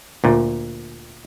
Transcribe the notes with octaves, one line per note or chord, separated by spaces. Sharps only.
D2 A#2